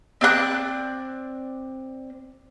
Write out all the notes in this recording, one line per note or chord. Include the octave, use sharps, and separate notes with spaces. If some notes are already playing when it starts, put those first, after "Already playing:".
C4 D5 F5 F#6